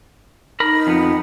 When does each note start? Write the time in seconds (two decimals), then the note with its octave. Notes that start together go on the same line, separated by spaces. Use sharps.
0.60 D#4 A#4 B5
0.87 F2 B3